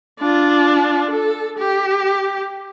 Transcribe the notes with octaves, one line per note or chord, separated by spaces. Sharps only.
D4 F4
A4
G4